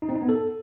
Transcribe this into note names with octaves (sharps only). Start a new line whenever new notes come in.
D#4
C4
D#4
B3
A4